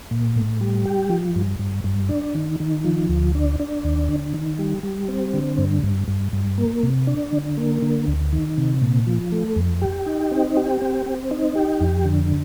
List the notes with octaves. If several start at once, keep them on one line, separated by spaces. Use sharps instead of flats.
A#2
A2
G3
G4
F3
G2
G2
G2
D4
D#3
D#3
F3
D2
D4
D4
D#2
D3
D#3
G3
G3
C4
D3
G2
G2
G2
G2
A#3
C3
D4
D3
A#3
D3
D2
D#3
C3
A#2
F3
A3
F2
G4
D#4
C4
G4
C4
C4
D#4
G4
F2
D3